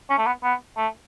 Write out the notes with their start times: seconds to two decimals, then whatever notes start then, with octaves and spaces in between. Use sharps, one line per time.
0.10 C#4
0.18 A3
0.26 B3
0.44 B3
0.77 A3